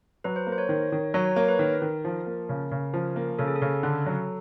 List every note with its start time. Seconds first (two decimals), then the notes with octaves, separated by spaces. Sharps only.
0.24 F#3 B4
0.36 C5
0.47 A#3
0.52 C5
0.58 C#5
0.69 D#3
0.92 D#3
1.14 F#3 C#5
1.25 C#5
1.36 A#3 C#5
1.48 B4
1.59 D#3 A#4
1.82 D#3
2.05 F3
2.27 A#3
2.49 C#3
2.71 C#3
2.94 F3
3.16 A#3
3.39 C#3 A4
3.47 G#4
3.56 A4
3.62 C#3
3.83 D3
4.06 F#3